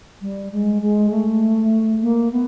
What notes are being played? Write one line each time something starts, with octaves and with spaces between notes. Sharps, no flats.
G3
G#3
G#3
A3
A#3
B3